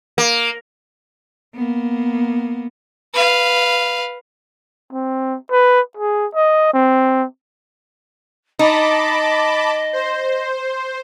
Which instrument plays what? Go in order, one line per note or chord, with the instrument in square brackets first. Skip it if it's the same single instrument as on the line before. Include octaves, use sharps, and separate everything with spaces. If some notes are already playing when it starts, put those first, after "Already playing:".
[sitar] A#3
[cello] A#3 B3
[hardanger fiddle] B4 F5
[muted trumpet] C4
B4
G#4
D#5
C4
[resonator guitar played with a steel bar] D#4 [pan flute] D#5 [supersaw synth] A5 B5 D6
[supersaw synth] C5